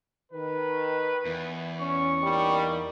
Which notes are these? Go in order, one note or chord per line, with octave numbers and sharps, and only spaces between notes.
D#3 B4
E2
C#4 C#6
G3 A#3 D#4